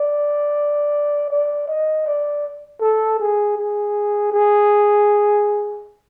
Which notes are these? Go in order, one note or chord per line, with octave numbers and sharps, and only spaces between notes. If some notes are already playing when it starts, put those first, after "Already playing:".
Already playing: D5
D5
D#5
D5
A4
G#4
G#4
G#4